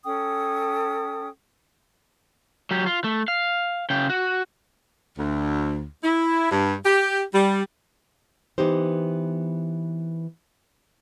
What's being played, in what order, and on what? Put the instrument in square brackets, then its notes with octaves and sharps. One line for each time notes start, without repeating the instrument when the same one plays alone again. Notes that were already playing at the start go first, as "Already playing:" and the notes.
[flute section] C#4 A4 G5 D#6
[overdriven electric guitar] F#3 G4
F4
A3
F5
C#3 G5
F#4
[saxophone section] D2
E4
G2
G4
G3
[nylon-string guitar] E3 B3 D#4 G4 C5